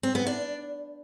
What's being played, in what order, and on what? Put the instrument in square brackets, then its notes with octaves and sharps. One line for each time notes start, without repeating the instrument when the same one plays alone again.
[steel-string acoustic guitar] C4
B3
D4